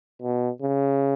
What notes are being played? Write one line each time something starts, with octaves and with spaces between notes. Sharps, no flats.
B2
C#3